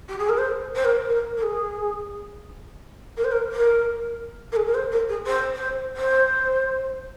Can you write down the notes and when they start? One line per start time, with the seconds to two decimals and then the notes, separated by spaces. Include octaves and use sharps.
0.09 G4
0.19 G#4
0.29 A#4
0.38 C5
0.75 C5
0.85 A#4
1.08 A#4
1.37 A#4
1.43 G#4
3.17 A#4
3.25 C5
3.32 A#4
3.52 A#4
4.52 A#4
4.56 G#4
4.66 A#4
4.74 C5
4.92 A#4
5.09 G#4
5.27 C5
5.55 C5
5.96 C5